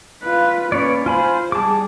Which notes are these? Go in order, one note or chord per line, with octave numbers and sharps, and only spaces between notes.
F4 B4
A#3 C#4 B4 C#5 D5
F4 C5 G#5 B5
G3 G#4 A5 D6